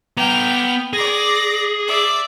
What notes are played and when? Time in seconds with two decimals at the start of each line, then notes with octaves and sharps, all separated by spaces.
0.17 B3 G5 A#5 F6
0.93 G#4 D5 A#6
1.88 D5 E5